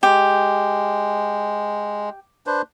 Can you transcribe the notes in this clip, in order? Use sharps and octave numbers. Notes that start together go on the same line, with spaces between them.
G#3 G4
D4 B4 C5